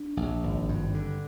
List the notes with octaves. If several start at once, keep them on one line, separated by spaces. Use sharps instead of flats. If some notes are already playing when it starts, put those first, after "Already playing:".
Already playing: D4
A#1
G#1
G2
D3